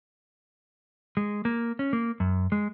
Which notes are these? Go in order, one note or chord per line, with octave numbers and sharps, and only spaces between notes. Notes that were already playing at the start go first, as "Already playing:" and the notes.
G#3
A#3
C#4
A#3
F#2
G#3